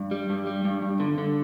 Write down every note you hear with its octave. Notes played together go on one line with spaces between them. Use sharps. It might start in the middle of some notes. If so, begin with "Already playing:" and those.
Already playing: G2
G3
G2
G3
G2
G2
D3
D3